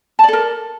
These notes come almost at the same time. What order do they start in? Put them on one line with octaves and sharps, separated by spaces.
A5 D5 A4 A#4